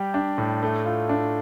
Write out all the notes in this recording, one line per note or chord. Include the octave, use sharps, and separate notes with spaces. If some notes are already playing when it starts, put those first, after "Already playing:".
Already playing: G3 G4
D4
A2
A3
F4
D4